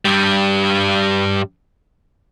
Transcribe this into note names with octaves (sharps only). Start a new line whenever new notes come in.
G2 G3